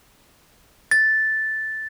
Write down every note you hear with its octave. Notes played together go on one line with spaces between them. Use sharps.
A6